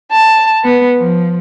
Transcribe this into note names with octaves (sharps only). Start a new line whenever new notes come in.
A5
B3
F3